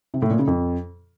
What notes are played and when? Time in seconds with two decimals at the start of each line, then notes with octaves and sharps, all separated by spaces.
0.14 C3
0.22 A2
0.31 A#2
0.39 C#3
0.47 F2